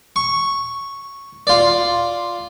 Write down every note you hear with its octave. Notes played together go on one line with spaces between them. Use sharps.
C#6
F4 D5